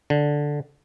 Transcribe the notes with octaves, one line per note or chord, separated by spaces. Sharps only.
D3